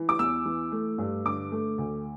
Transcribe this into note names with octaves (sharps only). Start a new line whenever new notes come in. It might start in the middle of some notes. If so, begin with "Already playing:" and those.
Already playing: E3
D6
E2 E6
E3
A3
G2
D3 D6
A3
D2